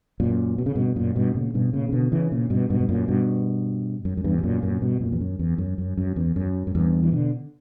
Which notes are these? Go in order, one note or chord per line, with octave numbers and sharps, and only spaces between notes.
F#2 A#2
B2
C#3
G2 B2
F#2 A#2
G2 B2
A#2 C#3
G2 B2
A#2 C#3
C#3
B2 D3
C#3 E3
A#2 C#3
G2 B2
G2 B2
G2
F#2 A#2
G2 B2
F#2
F#2
E2 G2
B2
F#2 A#2
F#2 A#2
G2 B2
F#2 A#2
E2
F#2
E2
F#2
F#2
F#2
E2
F#2
F#2
E2 G2
E3
B2 D3